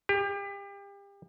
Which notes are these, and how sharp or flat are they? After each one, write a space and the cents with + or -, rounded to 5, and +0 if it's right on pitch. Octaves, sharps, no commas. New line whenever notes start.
G4 +30